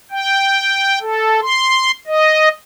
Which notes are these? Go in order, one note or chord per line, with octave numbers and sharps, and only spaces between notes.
G5
A4
C6
D#5